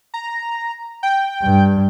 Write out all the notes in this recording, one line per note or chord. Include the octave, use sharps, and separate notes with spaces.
A#5
G5
G2